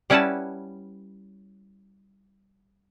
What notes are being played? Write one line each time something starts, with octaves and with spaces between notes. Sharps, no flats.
G3 C#4 E4 B4 F#5 A5